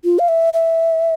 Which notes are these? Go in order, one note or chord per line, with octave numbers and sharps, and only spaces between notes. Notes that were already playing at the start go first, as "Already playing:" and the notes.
F4
F5
E5
E5